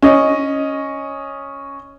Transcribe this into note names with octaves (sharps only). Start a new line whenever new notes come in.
C#4 D#5